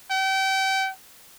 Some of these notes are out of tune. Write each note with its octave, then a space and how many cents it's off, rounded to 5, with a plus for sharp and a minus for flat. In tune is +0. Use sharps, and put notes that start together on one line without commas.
G5 -30